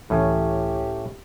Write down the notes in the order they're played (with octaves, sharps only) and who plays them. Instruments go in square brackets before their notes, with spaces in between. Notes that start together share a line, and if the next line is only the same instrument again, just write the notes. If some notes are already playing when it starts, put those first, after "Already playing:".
[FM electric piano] C#2 E3 [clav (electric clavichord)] A2 C#4 [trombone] G4